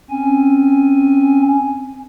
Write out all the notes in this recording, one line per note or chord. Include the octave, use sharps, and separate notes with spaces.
C4 C#4 G#5